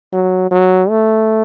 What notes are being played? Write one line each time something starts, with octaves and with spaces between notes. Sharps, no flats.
F#3
F#3
A3